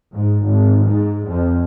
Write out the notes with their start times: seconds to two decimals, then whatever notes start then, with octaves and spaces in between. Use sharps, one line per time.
0.13 G#2
0.43 G#1
0.85 G#2
1.28 F2